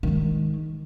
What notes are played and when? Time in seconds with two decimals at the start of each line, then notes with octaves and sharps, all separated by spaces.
0.03 D#3 G#3